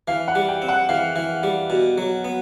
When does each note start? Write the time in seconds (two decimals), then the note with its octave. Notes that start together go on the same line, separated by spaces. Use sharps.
0.08 E3 F5
0.28 F#5
0.35 G3
0.49 G5
0.62 C4
0.68 F#5
0.89 E3 F5
1.16 E3
1.43 G3
1.70 B2
1.98 F#3
2.24 B3